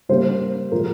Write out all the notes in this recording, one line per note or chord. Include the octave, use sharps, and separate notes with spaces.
C#3 G3 A#3 C5
A#2 F3 G#3 A#4